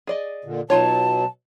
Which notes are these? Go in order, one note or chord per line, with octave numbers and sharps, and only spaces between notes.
G#4 D5 D#5
A#2 D3
B2 F#3 D#4 F4 C#5 A5